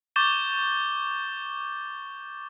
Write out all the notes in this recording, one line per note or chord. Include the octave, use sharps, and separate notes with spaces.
C#6 D6 G6 A6 E7 G7